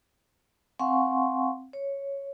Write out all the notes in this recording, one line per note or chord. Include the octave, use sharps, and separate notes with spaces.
C4 F5 F#5 G#5 C6 C#6
C#5